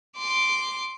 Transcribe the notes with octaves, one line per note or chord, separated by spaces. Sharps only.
C6 D6